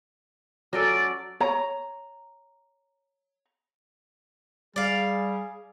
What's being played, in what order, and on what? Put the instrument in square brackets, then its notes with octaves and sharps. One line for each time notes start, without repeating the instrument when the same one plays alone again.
[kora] F#3 C#4 A4 [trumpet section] D5
[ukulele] C#5 A#5
[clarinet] G3 [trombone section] G#4 [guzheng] D5 F5